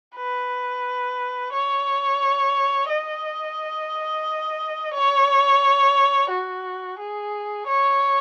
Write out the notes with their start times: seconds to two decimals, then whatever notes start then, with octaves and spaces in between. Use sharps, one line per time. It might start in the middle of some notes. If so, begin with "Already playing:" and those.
0.16 B4
1.53 C#5
2.89 D#5
4.94 C#5
6.30 F#4
6.99 G#4
7.67 C#5